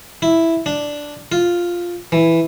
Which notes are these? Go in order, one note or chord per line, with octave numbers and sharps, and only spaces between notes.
E4
D4
F4
E3